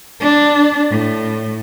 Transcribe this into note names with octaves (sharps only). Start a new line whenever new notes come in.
D4
A2